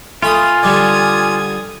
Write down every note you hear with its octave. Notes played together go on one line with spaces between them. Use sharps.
A3 F4 G#5 B5 D#6
D3 G3 D5 D#6 G#6